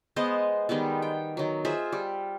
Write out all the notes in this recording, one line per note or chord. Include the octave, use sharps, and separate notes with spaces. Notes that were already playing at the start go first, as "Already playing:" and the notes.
G#3 B3 C5 D#5
D#3 G3 G#3 B3
G5
D#3 F#3
F4 G#4 C5 E5
G3